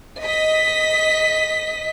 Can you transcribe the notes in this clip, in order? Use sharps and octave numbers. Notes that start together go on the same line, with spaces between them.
D#5 B6